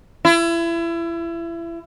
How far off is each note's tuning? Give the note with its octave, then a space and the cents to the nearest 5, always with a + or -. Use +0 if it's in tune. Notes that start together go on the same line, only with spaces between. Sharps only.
E4 +30